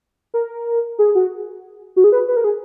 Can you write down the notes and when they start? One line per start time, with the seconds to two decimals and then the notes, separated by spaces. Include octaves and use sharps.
0.34 A#4
0.99 G#4
1.15 F#4
1.96 F#4
2.04 G#4
2.12 B4
2.28 B4
2.37 A#4
2.44 G#4